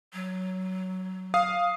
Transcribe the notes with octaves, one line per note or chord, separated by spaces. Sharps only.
F#3
F5 D#6 C7